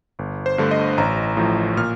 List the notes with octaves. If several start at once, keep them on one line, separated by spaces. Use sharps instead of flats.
G1
C5
G2 D3 A3
D#5
A1 A#5
A2 F3
A#2 F6